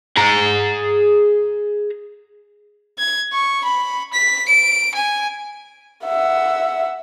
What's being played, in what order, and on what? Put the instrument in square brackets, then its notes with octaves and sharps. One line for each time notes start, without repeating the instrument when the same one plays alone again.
[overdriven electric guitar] G#4 A#5
[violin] G#6
C#6
B5
B6
D7
G#5
[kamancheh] E5 F#5